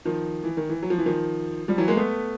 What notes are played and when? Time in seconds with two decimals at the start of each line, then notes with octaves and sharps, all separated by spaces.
0.05 D#3 F3
0.44 E3
0.57 D#3
0.69 E3
0.83 F#3
0.90 F3
0.98 E3
1.06 D#3 F3
1.68 F3 G3
1.78 E3 F#3
1.88 G#3 A#3
1.97 A3 B3